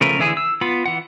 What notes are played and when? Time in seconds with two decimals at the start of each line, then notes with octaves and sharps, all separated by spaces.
0.01 C#3 F3 A3 A#4 B4
0.19 D3 E3 E4 G#4
0.37 E6
0.61 B3 F4 B5
0.86 E3 F#5